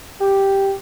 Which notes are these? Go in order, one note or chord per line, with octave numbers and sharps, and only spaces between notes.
G4